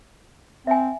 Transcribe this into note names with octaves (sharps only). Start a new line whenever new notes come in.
C4 E5 G#5